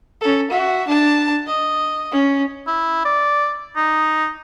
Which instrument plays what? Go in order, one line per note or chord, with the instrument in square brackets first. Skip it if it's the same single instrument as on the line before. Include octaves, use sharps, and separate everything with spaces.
[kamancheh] C#4 A4
F#4 E5
D4 A5
D#5
C#4
[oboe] E4
D5
D#4